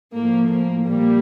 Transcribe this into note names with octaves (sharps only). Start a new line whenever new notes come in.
A2 F3 A#3
A#3
A#2 G3 A#3